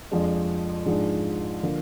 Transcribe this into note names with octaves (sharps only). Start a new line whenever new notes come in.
F2 F3 G#3 D4
G#2 F3 G#3 D4
D3 F3 A#3